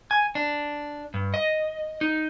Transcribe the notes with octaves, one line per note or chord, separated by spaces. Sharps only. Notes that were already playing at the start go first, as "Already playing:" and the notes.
G#5
D4
G2
D#5
D#4